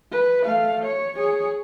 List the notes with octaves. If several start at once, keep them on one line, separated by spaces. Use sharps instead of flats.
B4
A3 F5
C#5
G#4 C#5